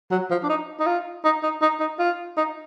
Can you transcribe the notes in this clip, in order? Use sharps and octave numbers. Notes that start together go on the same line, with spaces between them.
F#3
F3
D4
D#4
D#4
F4
D#4
D#4
D#4
D#4
F4
D#4